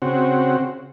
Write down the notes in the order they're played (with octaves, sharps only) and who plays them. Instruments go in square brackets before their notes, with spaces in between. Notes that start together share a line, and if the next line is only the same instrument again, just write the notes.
[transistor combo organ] C#3 C4 F#4